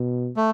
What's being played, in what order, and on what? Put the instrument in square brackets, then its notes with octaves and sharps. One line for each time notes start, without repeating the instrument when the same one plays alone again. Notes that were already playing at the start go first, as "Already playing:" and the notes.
Already playing: [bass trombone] B2
[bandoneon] A3